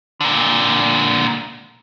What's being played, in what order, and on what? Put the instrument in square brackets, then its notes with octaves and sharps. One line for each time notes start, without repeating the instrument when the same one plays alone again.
[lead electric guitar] A#2 D3